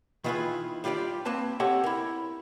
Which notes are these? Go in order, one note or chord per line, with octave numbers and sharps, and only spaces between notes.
D#3 E3 F4 G4 G#4 B4
G3 D4 F4 G4 D5
A#3 C4 B4 A5
C4 G4 A4 C#5 F#5 A5
E4 A#4